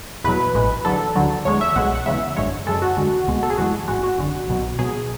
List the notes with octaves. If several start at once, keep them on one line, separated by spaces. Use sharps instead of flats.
E2 B2 F#3 B4
A1 A2 G#3
E2 D3 F#3 A4
D2 D3 F#3
E2 D3 G#3 C#5
E5
B1 B2 G#3 F#5
F#5
E2 C#3 G#3 E5
G#1 F#2 D3 G#3 C#5
F#2 C#3 G#3 A4
F#4
E2 D3 G#3
C#2 B2 G#3
A4
G#4
F#2 E3 G#3 F#4
G#1 G#2 G#3 F#4
F#4
G#1 F#2 D3
B1 B2 F#3
C#2 B2 F#3 G#4